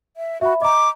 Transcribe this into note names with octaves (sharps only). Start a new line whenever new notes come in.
E5
F#4 E5 B5
D#5 A#5 D6